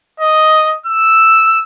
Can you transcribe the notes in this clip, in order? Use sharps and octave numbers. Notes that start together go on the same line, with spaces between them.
D#5
E6